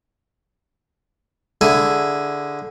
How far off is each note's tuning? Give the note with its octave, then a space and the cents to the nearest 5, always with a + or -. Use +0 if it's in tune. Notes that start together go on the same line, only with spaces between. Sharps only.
D3 -5 E4 +0 G#4 +0